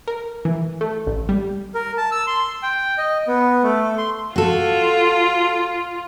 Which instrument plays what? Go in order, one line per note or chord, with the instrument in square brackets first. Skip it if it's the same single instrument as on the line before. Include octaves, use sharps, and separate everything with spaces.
[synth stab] A#4
E3
A3
A1
G3
[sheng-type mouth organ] A#4
A5
E6
C6
G5
D#5
B3
A3
C6
[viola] F4 [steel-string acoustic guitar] F#4 A4